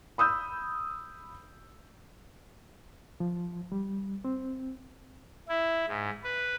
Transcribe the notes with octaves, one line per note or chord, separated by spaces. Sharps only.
B5 D#6 E6 G6
F3
G3
C4
E4
G#2
B4